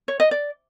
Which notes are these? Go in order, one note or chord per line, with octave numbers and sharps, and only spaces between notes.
C#5
D#5
D5